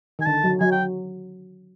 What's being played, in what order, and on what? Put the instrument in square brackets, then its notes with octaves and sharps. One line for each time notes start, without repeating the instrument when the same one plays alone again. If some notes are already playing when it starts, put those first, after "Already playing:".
[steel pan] D#3
[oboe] G#5
[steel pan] D3 [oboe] A5
[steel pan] F#3
[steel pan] F#3 [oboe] G#5
[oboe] G5